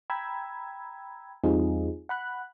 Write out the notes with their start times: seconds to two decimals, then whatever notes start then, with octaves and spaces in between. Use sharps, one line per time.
0.10 G5 A#5 B5 E6 G#6
1.44 E2 G3 C4 D#4 F4 G#4
2.09 F#5 B5 F#6